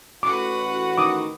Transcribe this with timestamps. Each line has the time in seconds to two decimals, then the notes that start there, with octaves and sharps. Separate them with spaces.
0.23 A1 F#4 B4 F#5 D6
0.98 D#3 D6 D#6